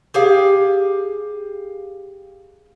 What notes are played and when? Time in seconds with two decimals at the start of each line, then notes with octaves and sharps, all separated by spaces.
0.14 G4 G#4 F5